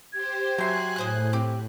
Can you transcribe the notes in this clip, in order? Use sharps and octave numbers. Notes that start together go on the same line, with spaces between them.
G4 C5 G#6
F#3 E5 G5 G#5 C6 F#6 C7
A2 G#4 C5 F#6
C4 G4 D6